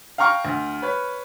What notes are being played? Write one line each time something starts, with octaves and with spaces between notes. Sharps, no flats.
F5 G5 A#5 C#6 F6
D2
B4 C#5